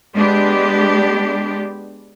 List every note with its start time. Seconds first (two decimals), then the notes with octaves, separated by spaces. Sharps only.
0.15 G#3 B3 D4 G4